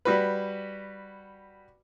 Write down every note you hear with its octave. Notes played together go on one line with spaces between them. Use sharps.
G3 F#4 B4